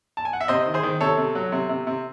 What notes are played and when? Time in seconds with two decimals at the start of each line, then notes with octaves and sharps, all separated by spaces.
0.17 A5
0.25 G#5
0.33 F#5
0.41 E5
0.48 C3 C5 D#5
0.66 D#3
0.74 G#4 C5
0.83 D#3
1.00 C3 A4 C#5
1.18 C3
1.35 F#3
1.52 C3
1.69 C3
1.87 C3